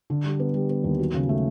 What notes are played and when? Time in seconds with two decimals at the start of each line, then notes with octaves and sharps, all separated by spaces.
0.10 D3
0.25 G3
0.39 B3
0.54 G3
0.69 B3
0.84 D#2
0.99 F#3
1.14 C#3
1.29 A3